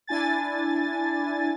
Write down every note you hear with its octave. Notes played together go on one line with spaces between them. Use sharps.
D4 E4 G#5 A6